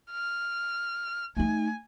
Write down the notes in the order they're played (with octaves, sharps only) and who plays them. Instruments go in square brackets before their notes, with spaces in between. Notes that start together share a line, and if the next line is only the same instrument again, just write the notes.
[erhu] F6
[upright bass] A3 D#4 [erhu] G#5